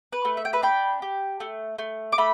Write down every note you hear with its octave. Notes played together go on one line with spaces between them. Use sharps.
B4
A3
E5
G5
B4 E5
D4 G5 B5
G4
A3
A3
D6
A3 B5